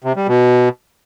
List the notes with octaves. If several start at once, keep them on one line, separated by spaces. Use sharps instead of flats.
C3
G3
B2